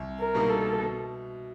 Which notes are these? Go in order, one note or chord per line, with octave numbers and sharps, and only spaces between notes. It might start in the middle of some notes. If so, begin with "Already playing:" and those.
Already playing: C2
A#4
B2 G3 A#3 D#4
A4
B2